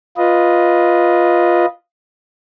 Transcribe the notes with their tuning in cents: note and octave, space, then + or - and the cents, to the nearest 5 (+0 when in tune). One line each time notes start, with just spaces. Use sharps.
F4 +0 B4 -10 D#5 +0